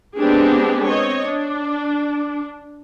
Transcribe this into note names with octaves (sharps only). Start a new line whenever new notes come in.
G#3 B3 C4 D4 G4 G#4
C4 C#5 D#5
D4